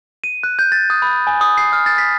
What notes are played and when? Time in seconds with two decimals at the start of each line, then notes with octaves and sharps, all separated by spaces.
0.24 D#7
0.43 F#6
0.59 G6
0.72 A6
0.90 D#6
1.02 B5
1.27 G#5
1.41 D#6
1.58 C7
1.73 F6
1.86 A6
1.98 B6